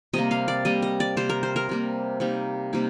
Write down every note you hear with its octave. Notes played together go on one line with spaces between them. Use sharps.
C3 G3 A#3 D#5
F5
D5
C3 G3 A#3 D#5
D#5
D5
C3 G3 A#3 C5
A#4
C5
A#4
C3 G3 A#3
C3 G3 A#3 D#4
C3 G3 A#3 D#4